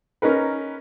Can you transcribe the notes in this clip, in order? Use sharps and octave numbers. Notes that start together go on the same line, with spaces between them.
C#4 D#4 A#4 B4